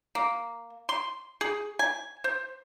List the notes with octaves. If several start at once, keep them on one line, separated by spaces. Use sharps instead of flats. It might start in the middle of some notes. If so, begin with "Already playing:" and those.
A#3
C6
G#4
G#5
C5